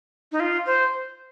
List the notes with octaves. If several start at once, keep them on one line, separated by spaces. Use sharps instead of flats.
D#4
F4
C5